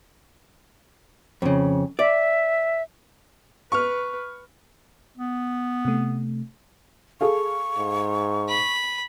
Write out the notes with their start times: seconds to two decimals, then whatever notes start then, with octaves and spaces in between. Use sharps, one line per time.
1.42 F2 C#3
1.99 D5 E5
3.72 B4 C#6 F6
5.18 B3
5.85 C3 A3
7.21 G#4 A4 F5 C#6
7.77 G#2
8.49 B5